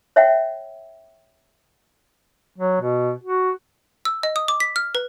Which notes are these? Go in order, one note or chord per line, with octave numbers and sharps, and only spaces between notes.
C#5 E5 F#5 G5
F#3
B2
F#4
E6
D#5
D#6
D6
B6
F6
B4